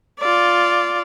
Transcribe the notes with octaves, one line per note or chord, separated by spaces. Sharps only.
F4 D5